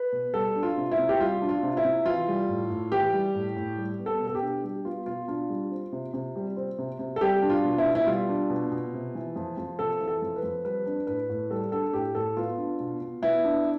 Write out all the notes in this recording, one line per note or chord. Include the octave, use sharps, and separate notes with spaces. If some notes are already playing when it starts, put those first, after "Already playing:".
Already playing: B4
B2
G3 A4
D4
F4
C3
E4
C3
G4
G3 F4
D4
F4
C3
E4
C3
E3 F4
G3
A2
A2
E3 G4
G3
A2
A2
G3
B3
A4
B2
A4
G4
D4
G3 G4
B3 F4
B2 F4
D4 F4
G3
C4
C3
C3
G3
C4
C3
C3
A4
G3 G4
D4
F4
B2
E4
B2
E4
G3 F4
D4
B2
B2
C3
E3
F2
F2
C3 A4
E3
A4
F2
B4
F2
G3 B4
D4
A2 B4
A2
G3 A4
D4 A4
A2 G4
A2 A4
B3 F4
D4
B2
B2
B3 E4
D4